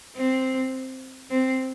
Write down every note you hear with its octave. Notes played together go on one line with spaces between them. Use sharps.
C4
C4